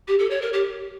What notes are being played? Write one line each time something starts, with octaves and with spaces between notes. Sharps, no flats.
G4
A4
C#5
A#4
G4